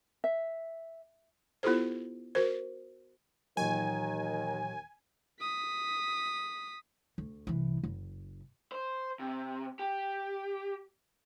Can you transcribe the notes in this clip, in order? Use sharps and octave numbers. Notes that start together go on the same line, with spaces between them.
E5
B3 E4 F4 G4 A4 C5
F#4 A#4 C5
D#2 A#2 D#3 E3 F#3 G#5
D#6 B6
D2
C2 E3
F#1
C5
C3
G4